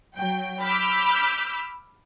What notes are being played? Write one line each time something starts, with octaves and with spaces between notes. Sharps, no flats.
F#3 G5
B5 D6 E6 F6 G6 B6